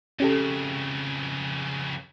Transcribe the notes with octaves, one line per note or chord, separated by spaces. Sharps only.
F2 C#3 C#4 G4 A4